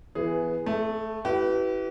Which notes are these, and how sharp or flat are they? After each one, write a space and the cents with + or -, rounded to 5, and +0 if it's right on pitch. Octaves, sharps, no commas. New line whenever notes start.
E3 +20 B3 +0 G#4 +0
A3 +0 G#4 +45
E4 +0 G4 -40 B4 +0